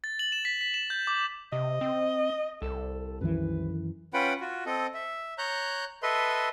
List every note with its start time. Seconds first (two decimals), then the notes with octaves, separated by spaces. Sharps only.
0.04 A6
0.19 F#7
0.32 E7
0.45 B6
0.61 B6
0.74 E7
0.90 G6
1.07 D6
1.52 C3 D#5
1.81 C4
2.62 C2 A4
3.21 F#2 D#3 E3 B4
4.14 C#4 F4 B4 F#5 G5 B5
4.40 F4 F#4
4.66 C4 A4 D#5
4.94 E5
5.38 C#5 A#5 F#6 G6
6.03 A4 B4 D#5 E5 C6